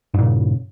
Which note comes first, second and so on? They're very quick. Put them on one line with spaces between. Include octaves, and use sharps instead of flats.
G2 A#2 C#3